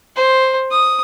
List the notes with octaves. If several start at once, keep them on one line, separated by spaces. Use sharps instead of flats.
C5
D#6